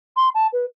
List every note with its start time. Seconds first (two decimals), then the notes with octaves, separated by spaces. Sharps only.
0.16 C6
0.34 A5
0.52 B4